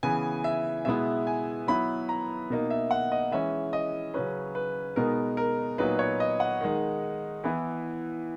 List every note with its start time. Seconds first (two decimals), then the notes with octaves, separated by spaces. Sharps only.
0.03 C#3 E3 B3 G#5
0.44 E5
0.85 B2 G#3 B3 E4 E5
1.27 G#5
1.67 F#3 B3 E4 B5
2.09 A#5
2.50 B2 A#3 D#4
2.70 E5
2.91 F#5
3.12 D#5
3.32 E3 G#3 C#4 E5
3.73 D#5
4.14 C#3 F#3 C#4 B4
4.55 B4
4.96 B2 G#3 B3 D#4 A#4
5.37 A#4
5.78 A#2 F#3 B3 D#4 B4
5.99 C#5
6.20 D#5
6.40 F#5
6.61 D#3 G#3 D#4
7.44 E3 B3 E4